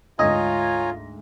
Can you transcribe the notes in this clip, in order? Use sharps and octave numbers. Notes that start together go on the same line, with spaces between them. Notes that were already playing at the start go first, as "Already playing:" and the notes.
D2 G#2 F4 C#5 D#5 G#5 A#5